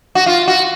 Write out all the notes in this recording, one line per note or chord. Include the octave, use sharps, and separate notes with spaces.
F#4
F4
F#4